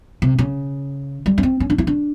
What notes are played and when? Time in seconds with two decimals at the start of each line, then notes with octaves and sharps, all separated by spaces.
0.22 C3
0.39 C#3
1.26 G3
1.38 C#4
1.43 C4
1.60 C#4
1.70 D4
1.78 E4
1.87 D4